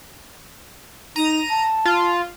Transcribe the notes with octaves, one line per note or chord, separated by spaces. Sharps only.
D#4 A#5 D#7
A5
F4